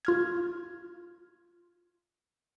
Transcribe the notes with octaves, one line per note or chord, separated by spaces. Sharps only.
F4 F6 G#6